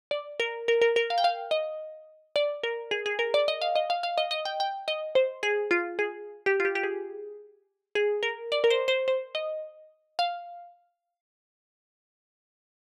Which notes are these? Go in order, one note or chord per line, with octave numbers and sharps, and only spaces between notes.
D5
A#4
A#4
A#4
A#4
F5
G5
F5
D#5
D5
A#4
G#4
G#4
A#4
D5
D#5
F5
D#5
F5
F5
D#5
D#5
G5
G5
D#5
C5
G#4
F4
G#4
G4
F4
G4
G4
G#4
G#4
A#4
D5
A#4
C5
C5
C5
D#5
F5